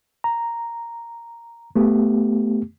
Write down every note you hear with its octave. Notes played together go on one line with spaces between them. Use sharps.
A#5
A3 B3 G4